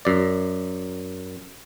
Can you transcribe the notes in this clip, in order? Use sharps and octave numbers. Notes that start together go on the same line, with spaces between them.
F#2 D5